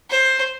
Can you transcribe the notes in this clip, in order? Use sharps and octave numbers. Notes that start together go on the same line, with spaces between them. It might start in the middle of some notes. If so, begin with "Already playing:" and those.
C5